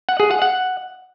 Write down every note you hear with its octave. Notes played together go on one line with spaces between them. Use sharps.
F#5
G#4
F#5
F#5